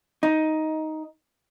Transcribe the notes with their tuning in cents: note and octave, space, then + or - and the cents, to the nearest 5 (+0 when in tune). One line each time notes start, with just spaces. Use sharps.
D#4 +10